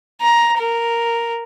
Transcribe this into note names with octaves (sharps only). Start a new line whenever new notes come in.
A#5
A#4